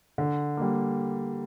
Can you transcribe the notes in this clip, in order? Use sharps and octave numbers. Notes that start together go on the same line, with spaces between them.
D3
G3 A#3